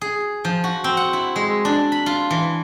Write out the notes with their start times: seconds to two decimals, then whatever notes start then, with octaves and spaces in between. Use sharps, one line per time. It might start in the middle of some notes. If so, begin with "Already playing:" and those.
0.01 G#4
0.45 F3
0.64 F#4
0.84 C4
0.97 F#5
1.13 E4
1.36 G#3
1.65 D4
1.92 B5
2.06 F4
2.31 E3